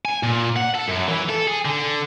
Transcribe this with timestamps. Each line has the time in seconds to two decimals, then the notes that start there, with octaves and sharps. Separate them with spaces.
0.05 G#5
0.23 A#2
0.56 F#5
0.75 A4
0.89 F#2
1.09 E3
1.30 A4
1.48 G#4
1.65 D3